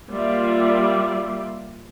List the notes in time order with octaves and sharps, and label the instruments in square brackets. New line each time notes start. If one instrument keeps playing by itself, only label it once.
[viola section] G3 A#3 F4 D5 E5